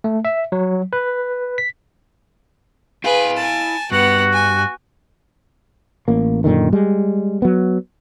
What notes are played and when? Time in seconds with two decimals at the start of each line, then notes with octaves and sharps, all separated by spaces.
0.04 A3
0.25 E5
0.52 F#3
0.93 B4
1.58 B6
3.04 E4 G#4 B4 F5
3.37 G#5 A5
3.92 G2 B3 F#4 F#5
4.33 G#5
6.08 A1 A#3
6.44 F#2 A#2 D3 D#3
6.73 G3 G#3
7.42 F#3 B3